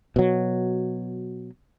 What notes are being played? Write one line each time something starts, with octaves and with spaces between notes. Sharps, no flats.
B2 F#3